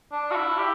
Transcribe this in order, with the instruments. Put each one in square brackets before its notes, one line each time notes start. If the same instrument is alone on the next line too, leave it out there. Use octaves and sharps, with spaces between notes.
[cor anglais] D4
F#4
E4
G4